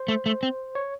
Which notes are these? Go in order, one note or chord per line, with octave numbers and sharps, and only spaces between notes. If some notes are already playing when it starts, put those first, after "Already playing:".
Already playing: C5
A3
A3
C4
C#5